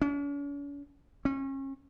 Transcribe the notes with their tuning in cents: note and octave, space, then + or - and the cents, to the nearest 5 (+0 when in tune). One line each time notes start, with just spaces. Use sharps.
C#4 +45
C#4 -35